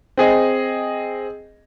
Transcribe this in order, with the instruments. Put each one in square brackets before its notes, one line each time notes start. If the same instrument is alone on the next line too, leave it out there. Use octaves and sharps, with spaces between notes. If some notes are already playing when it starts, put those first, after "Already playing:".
[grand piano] C4 G#4 D#5